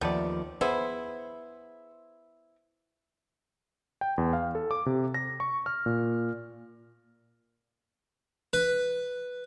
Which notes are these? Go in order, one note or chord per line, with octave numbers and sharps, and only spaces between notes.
D#2 C3 F3 A3 B3 D5
B3 E4 G#4 C5
G5
E2
F5
A4
D6
C3
A#6
C#6
F6
A#2
B4